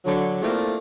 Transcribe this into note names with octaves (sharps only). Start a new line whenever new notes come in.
D3 F#3
A3 A#3 C4 D4 E4 F4